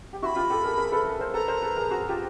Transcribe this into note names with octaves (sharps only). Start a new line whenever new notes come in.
G4
E4 F#4 B5 C#6
F4 G4
G4 A4
G#4 A#4
G#4 A#4
A4 B4
G#4 A#4
A#4 C5
A4 B4 A#5
A#4 C5
A4 B4
G#4 A#4
F#4 G#4
F4 G4